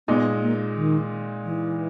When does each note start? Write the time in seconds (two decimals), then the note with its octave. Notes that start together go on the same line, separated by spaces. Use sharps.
0.08 A#2 G#3 B3 D#4
0.42 A#3
0.75 D#3
1.44 E3